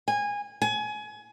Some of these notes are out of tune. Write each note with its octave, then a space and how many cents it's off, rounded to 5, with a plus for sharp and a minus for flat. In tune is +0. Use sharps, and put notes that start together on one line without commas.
G#5 -20
G#5 +25